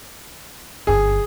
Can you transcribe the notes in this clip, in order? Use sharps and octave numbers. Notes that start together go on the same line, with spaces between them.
G1 F#2 G#4